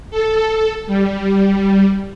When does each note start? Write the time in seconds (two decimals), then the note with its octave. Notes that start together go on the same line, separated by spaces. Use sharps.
0.11 A4
0.87 G3